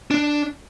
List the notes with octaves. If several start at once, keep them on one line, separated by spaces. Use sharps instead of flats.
D4